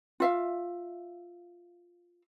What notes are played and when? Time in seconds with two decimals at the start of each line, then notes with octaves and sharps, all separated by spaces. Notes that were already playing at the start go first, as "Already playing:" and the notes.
0.20 F4 E5 F5